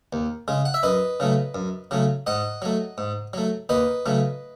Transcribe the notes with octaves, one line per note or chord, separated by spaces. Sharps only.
D#2
C#3 G#3
F#5
E5
F#2 B4 D#5
C#3 F#3 A3
F#2
C#3 F#3 A3
G#2 D#5 F#5
F#3 A3
G#2
F#3 A3
D#2 B4 D#5
C#3 F#3 A3